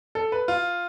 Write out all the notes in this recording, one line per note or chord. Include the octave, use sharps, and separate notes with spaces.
A4
B4
F4